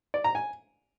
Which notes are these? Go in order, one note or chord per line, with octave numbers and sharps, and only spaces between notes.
D5
A#5
G#5